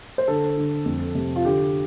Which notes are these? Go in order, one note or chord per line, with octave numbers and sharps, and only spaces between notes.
C5
D3 A4
D3
F2
C3
F4
D3 G4